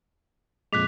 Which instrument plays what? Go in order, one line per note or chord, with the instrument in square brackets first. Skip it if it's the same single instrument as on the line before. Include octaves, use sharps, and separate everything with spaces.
[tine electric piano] F2 A#2 G#3 [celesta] D6 [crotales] F#6 B6 F7